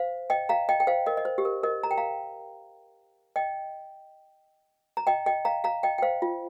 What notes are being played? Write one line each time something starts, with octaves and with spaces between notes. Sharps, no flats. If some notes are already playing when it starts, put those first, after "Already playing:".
Already playing: C5 F5
D#5 G5
F5 A#5
D#5 G5
G5
C5 F5
A#4 D#5
D#5
C5
G4
A#4
A#4 D#5
A#5
G5
F5 A#5
D#5 G5
A#5
D#5 G5
D#5 G5
F5 A#5
F5 A#5
D#5 G5
G5
C5 F5
F4